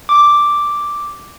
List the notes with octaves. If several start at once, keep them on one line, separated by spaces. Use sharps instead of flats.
D6